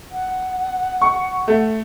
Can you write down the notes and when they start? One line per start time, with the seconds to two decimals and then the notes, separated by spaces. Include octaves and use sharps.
0.12 F#5
1.02 C#6
1.48 A3